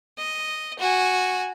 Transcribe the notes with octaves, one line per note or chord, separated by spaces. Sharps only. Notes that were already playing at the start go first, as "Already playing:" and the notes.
D#5
F#4 G#5